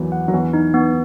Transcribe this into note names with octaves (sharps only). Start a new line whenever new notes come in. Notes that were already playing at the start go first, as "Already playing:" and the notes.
Already playing: E2 E3 F#3
F#5
F#3
E2 E3 B3
D#4
B3